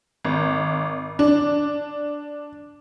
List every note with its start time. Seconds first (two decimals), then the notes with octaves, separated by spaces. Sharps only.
0.25 G#1
1.19 D4